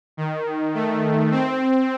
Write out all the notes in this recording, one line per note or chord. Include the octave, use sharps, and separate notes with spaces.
D#3
A3
C4